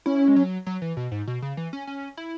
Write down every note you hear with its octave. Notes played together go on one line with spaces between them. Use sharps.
C#4 E4
G#3
F#3
F#3
E3
B2
G#2
B2
C#3
E3
C#4
C#4
E4